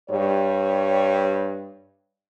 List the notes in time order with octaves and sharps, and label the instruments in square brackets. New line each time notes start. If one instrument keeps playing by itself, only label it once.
[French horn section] G2 G3 C#5